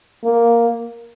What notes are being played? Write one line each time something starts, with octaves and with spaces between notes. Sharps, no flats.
A#3